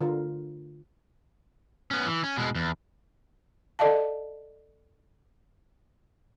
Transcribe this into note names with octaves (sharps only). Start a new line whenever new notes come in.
D3 F4 A#4
B3 C#4
E3
C#4
B2 G#3
E2
A4 D5 D#5 F5 A5